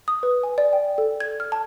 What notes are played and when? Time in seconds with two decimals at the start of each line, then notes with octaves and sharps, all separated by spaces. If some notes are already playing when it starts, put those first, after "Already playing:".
0.08 D#6
0.23 B4
0.43 G#5
0.58 D5
0.73 G5
0.98 A4
1.20 G#6
1.40 F6
1.52 A5